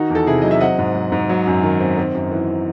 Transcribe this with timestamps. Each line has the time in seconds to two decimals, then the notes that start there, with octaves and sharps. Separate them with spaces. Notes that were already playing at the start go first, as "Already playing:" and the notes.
Already playing: D#3 D#4 F#4
0.10 E2
0.15 A4
0.26 C3 E4 G#4
0.42 F#3 D#5
0.51 E5
0.61 C4 D#5 F#5
0.78 G#2
0.95 F#3
1.12 G#2
1.29 F#3
1.46 F#2
1.63 D#3
1.80 C4
1.97 C4
2.15 F#2
2.32 E3